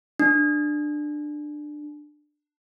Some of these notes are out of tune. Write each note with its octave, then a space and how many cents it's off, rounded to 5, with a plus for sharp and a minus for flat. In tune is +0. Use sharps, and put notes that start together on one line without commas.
D4 +15